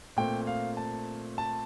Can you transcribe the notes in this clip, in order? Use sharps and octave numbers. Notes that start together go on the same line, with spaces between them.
A#2 A3 C4 G5
F5
A5
A5